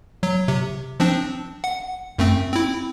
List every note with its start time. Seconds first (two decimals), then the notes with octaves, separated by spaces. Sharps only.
0.23 F#3
0.48 C3
1.00 F3 C4 D4
1.64 F#5
2.19 F#2 A3 C4
2.52 C4 E4